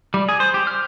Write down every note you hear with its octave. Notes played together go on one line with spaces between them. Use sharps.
G3
G#4
C5
G4
F6